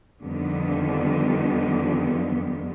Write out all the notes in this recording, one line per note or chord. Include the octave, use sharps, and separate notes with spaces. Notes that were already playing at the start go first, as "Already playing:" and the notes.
F2 D3 D#3 G3 B3